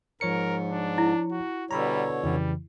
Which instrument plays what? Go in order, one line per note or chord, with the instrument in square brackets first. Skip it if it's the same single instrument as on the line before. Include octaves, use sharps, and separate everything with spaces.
[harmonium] G#2 [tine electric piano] F3 C#5 C#7 [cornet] A#4
[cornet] D4
[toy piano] E4
[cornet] F#4
[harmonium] B2 D3 C#5 [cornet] G3 [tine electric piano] A#5 B5 E6
[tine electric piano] F2 C#3 E3 [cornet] G3